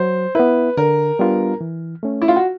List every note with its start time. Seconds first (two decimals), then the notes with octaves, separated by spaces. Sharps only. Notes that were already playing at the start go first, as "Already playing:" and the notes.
Already playing: F#3 C5
0.35 B3 E4 B4
0.77 D3 A#4
1.19 G3 B3 D4 F4
1.61 E3
2.03 A3 C#4
2.22 E4
2.28 F4
2.36 F#4